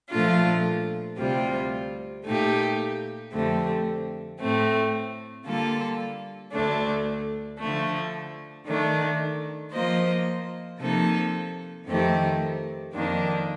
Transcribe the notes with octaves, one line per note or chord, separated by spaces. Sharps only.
A#2 F3 A3 D4 F4
D2 C3 G3 C4 F4
A#2 A3 D#4 G4
F2 D3 A3 C4 G4
A2 A3 C4
D3 G3 A#3 F4 A4
D2 D3 A3 D4
D3 F3 A3
D#3 A3 D4
F3 A#3 F4 C5 D#5
C3 F3 A#3 D#4 A4
F2 D#3 A3 C4 G4
F2 D#3 A#3 D4